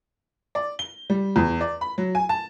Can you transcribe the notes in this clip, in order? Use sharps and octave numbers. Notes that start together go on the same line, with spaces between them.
D5
G7
G3
E2
D5
B5
F#3
G#5
A5